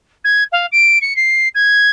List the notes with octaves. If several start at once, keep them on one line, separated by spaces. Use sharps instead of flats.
G#6
F5
D7
C#7
C7
G#6